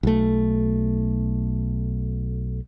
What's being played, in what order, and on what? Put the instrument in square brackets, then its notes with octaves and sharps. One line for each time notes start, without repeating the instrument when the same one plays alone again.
[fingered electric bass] B1 A3